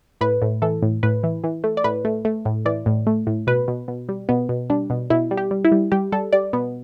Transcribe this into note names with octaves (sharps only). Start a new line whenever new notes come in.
A2 B4
A2
E3 A4
A2
A2 B4
E3
E3
A3
D5
A2 B4
A3
A3
A2
E3 D5
A2
A3
A2
B2 B4
B2
B2
G3
B2 B3
B2
G3 D4
B2
B2 E4
G3
G4
G3
E4
G3
G3 G4
G3 A4
G3 D5
B2 B3